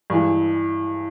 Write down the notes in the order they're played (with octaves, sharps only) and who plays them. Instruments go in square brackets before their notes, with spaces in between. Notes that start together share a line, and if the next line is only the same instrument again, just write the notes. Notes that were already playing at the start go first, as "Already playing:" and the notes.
[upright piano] G2 E3 G#3